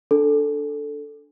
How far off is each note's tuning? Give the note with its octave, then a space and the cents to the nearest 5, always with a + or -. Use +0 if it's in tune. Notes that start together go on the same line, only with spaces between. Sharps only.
D4 +0 A4 +0